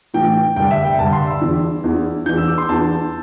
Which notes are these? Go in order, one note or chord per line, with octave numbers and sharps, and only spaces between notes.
A2 E3 G5
G2 D3 G5
E5
G5
G2 D3 A5
C6
E6
E2 E3
E2 E3
E2 E3 G6
E6
D6
C6
E2 E3 A5